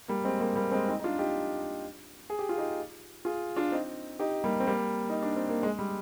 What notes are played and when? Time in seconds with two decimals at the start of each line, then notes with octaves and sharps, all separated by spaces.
0.08 G3 A#3
0.24 G#3 C4
0.40 G3 A#3
0.56 G3 A#3
0.71 G#3 C4
0.88 C4 D#4
0.99 D#4
1.04 D4 F4
1.19 D#4 G4
2.30 G#4
2.39 G4
2.49 F4
2.58 D#4 G4
3.25 F4 G#4
3.56 D4 F4
3.72 C4 D#4
4.19 D#4 G4
4.44 G3 A#3
4.60 C4
4.67 G3 A#3
5.10 D#4
5.22 D4
5.36 C4
5.49 A#3
5.63 G#3
5.79 G3